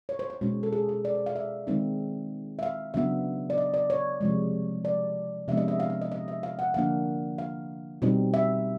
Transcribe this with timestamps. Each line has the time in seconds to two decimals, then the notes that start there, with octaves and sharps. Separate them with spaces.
0.09 C#5
0.19 C5
0.30 C5
0.41 B2 G#3 C#4
0.63 A4
0.72 G#4
0.89 G#4
1.05 D5
1.15 C5
1.26 F5
1.36 E5
1.67 D#3 G#3 C4 D#4
2.59 E5
2.63 F5
2.94 C#3 F#3 B3 D4 E5
3.50 D5
3.58 D#5
3.74 D5
3.90 C#5
4.21 C3 F3 G#3
4.85 D5
5.48 C3 F3 G#3 B3 D4 E5
5.57 D#5
5.68 E5
5.80 F5
5.90 F5
6.01 D#5
6.12 D#5
6.28 E5
6.43 F5
6.59 F#5
6.74 D3 F3 A#3 D4 F5
7.38 F5
8.02 B2 G3 C4 D#4
8.34 E5